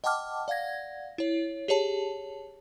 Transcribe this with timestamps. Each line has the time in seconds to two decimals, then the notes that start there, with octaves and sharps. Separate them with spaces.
0.04 D#5 F#5 G5 A5 D6 F6
0.48 D5 F5 F#5 G#6 A#6
1.18 E4 C#5
1.68 G4 G#4 C#5 A5